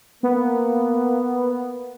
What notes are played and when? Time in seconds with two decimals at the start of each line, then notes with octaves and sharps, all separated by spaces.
0.23 A#3 B3